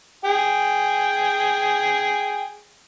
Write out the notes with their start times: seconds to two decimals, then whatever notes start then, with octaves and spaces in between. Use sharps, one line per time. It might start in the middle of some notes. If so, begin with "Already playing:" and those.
0.25 G#4 G5